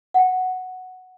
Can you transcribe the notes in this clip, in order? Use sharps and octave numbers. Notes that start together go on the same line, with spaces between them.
F#5 G5